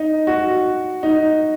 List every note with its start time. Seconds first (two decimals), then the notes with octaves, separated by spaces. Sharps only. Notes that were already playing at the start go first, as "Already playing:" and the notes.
Already playing: D#4
0.27 F#4
1.03 D#4